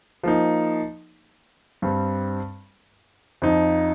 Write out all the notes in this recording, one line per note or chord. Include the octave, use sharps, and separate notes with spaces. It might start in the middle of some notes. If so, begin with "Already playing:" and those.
F3 A#3 D#4
G2 G3 C4
F2 F3 D#4